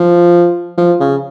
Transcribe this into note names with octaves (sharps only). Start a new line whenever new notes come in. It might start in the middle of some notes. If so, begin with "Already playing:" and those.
Already playing: F3
F3
C#3